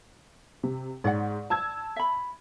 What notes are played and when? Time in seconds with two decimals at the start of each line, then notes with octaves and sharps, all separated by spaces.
0.63 C3
1.04 G#2 C#5 D5 F#5
1.50 A5 E6 G#6
1.96 E5 B5